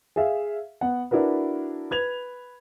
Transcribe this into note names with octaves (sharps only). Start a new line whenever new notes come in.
G#4 E5 F5
B3 F#5
D4 E4 F#4 A#4 B4
B4 G#6 F7